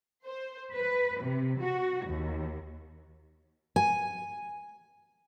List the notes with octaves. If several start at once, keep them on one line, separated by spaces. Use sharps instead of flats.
C5
B4
C3
F#4
D#2
G#5